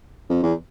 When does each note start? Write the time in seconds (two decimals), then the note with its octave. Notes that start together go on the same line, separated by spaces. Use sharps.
0.30 F2
0.43 E2